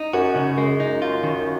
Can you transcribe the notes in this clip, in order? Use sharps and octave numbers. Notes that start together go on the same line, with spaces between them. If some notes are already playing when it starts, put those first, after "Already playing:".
Already playing: D#4
F#2 F#4
C#3
F#2 G#3
D#4
F4
D#3